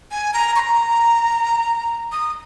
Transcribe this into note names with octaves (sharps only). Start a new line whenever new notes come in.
G#5
A#5
C#6
A#5
D#6